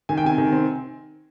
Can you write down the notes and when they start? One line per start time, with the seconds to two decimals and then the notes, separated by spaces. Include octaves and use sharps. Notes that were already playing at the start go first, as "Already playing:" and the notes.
0.09 D#3 G#5
0.17 G5
0.24 C3 G#5
0.38 D#3
0.53 C4